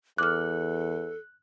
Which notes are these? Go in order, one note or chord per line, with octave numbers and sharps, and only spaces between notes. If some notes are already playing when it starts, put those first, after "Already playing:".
E2 A4 D6 F6 F#6